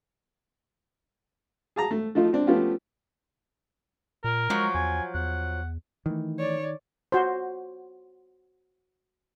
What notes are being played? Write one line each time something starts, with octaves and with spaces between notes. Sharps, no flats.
G#4 A5 A#5
A3
F3 A3 D#4 F4
C4 D4
F3 A3 B3 C#4 F4 G4
A#2 A#4
F3 F#3 G#3
E2 G#5
E2 F#5
D#3 E3 A3
C#5 D5
F#4 C5